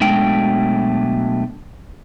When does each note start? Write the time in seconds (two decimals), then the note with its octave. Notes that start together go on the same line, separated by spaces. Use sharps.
0.01 B2 F#3 G#3 A3 D4 G5